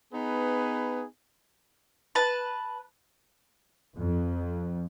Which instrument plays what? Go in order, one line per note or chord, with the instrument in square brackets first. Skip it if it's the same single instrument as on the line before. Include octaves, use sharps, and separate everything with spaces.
[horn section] B3 D#4 G#4 B4
[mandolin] B4 A5
[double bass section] F2